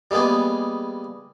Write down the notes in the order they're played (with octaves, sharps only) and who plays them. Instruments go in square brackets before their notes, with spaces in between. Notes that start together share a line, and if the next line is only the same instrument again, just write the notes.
[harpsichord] G3 G#3 A#3 B3 G#4